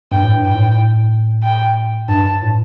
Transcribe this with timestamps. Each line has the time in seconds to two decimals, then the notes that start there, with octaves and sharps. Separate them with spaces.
0.12 G2 G5
0.24 A2
0.33 G2
0.45 G5
0.55 A2
1.43 G5
2.09 G2 A5
2.43 A2